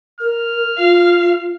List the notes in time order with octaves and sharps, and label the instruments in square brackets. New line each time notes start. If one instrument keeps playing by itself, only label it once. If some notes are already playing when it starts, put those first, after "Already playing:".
[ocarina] A#4 [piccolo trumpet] F6
[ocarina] F4 [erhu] F5